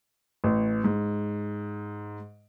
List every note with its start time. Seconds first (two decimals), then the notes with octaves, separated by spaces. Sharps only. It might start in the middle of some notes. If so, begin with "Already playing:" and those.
0.44 A1
0.84 G#2